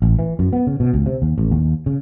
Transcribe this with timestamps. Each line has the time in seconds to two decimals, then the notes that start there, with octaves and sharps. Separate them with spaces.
0.02 A1
0.19 E3
0.39 F#2
0.53 B3
0.67 C#3
0.80 B2
0.93 C#2
1.06 C3
1.22 D#2
1.38 A1
1.51 D#2
1.86 C#3